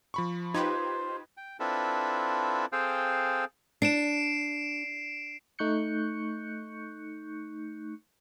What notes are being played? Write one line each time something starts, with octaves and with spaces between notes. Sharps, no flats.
F3 B5 C#6
D#4 F4 G4 B4 C5 G#6
G5
C4 D4 E4 F4 A4 B4
C4 G#4 A4 C5 F5 G5
D4 C7 D7 E7
A3 D#4 C#6 F#6 G6 C#7